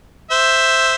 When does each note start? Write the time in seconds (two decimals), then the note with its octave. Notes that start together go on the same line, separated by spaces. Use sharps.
0.30 C5 E5